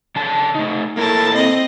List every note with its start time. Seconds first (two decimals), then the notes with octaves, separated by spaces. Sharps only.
0.16 C#3 D4 A5
0.55 A3 D#4
0.97 A#3 E4 A4 A#4 A5
1.36 C4 D#5